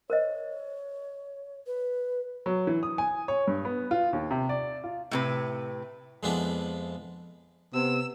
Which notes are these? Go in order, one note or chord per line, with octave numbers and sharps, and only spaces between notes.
A#4 C5 C#5 D#5
B4
F#3
E3
D#6
G#5
C#5
G2
B3
F4
D#2
C3
D5
F4
A2 C3 B4
F2 F3 G#3 B3 D4 E4
C3 B3 E6